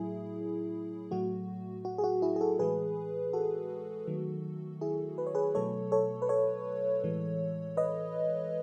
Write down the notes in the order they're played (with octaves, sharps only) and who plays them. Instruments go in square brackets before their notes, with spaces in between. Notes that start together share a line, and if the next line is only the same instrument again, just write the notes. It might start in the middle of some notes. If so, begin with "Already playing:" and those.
Already playing: [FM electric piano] A2 F#3 A3 E4 G#4
A2 F#3 A3 F#4
F#4
G#4
F#4
E4 G#4
G#4
F#4 A4
A2 E3 G#3 G#4 B4
F#4 A4
D#3 F#3 A3
E4 G#4
B4
C#5
G#4 B4
B2 F#3 A3 A4 C#5
A4 C#5
B4
A4 C#5
A2 E3 G#3
B4 D#5